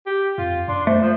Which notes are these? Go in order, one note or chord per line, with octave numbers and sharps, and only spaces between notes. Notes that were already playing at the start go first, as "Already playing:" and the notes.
G4
F2 F4
F#2 D4 C6
A3 C5
F3 C5